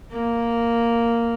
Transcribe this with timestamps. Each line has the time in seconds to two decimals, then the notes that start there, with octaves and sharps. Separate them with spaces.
0.11 A#3